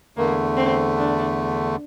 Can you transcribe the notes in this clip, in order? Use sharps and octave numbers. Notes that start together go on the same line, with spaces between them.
E2 D3 A3 A#3
C4
D4